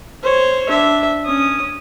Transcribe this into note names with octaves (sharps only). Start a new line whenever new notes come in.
C5 C#5
D4 E5
C#4 D#6